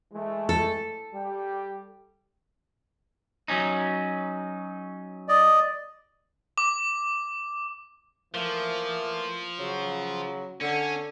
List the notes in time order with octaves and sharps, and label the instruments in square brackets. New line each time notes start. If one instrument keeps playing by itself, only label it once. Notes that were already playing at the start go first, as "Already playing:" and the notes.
[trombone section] E3 G#3 A3
[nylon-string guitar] A4
[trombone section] G3 G4
[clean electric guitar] F#3 C#4 D#4
[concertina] D5 D#5
[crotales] D6
[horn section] E3 A3 A#3 [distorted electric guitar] F3
[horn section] C#3 F#3
[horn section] D3 [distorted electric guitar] C#4